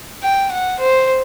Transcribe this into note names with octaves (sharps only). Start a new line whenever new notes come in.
G5
F#5
C5